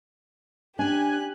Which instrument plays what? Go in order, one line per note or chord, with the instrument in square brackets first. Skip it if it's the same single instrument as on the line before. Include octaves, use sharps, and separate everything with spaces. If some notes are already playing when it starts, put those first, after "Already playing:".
[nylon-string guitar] D4 [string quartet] G4 F#6 [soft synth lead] G#5